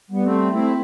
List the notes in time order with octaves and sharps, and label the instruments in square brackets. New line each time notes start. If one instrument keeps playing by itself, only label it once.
[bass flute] G3 [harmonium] B3
[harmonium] A3 C4
[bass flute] A3 [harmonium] C4 E4